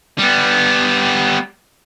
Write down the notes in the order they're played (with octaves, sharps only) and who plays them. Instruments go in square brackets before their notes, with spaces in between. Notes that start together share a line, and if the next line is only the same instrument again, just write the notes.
[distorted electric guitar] G3 B3